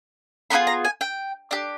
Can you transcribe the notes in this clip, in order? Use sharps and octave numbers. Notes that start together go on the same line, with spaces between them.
B3 D4 F4 G#4 B5
A#5
G#5
G5
D4 G4